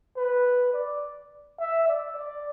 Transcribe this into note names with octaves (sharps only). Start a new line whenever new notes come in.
B4
D5
E5
D5
D5